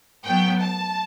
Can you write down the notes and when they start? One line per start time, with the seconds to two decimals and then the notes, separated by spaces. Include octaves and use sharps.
0.25 A2 F#3 B3 G5
0.60 A5